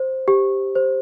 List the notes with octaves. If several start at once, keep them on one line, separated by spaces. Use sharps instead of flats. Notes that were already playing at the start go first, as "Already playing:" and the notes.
Already playing: C5
G4
C5